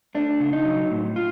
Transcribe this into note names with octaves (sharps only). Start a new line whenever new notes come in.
A3 D4
C#3
D#4
F#3
A2
F4